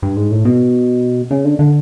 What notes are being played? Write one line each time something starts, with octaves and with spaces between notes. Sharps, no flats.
G2
G#2
A2
B2
C#3
D3
D3